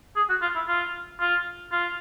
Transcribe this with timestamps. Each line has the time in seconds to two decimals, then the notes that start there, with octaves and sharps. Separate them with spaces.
0.16 G#4
0.29 F#4
0.42 F4
0.55 E4
0.68 F4
1.20 F4
1.72 F4